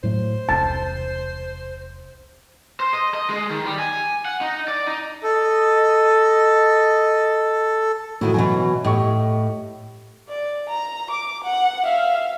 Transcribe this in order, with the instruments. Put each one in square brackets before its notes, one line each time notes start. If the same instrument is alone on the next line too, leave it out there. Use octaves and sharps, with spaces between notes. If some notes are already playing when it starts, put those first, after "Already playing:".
[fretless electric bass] A2 F#3 A3 [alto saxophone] C5
[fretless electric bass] E1 C2 [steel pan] A5
[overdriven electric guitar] C5
D#5
D#5
G#3
D#3
G3
G#5
F#5
D#4
D5
D#4
[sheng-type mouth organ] A4 [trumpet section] D#5
[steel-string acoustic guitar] F2 D#3 E4 [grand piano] A2 F#4
[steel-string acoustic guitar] B2 E3 F#3 [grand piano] G#5
[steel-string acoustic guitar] A2 [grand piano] G4 D#5 C#6
[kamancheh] D5
A#5
D6
F#5
E5 F5